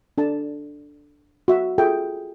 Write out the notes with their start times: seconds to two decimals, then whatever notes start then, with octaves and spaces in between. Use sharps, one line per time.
0.18 D4 A4 A5
1.48 F#4 E5
1.78 F4 G#4 A4 E5 G5